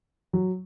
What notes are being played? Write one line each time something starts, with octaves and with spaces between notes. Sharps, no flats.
F#3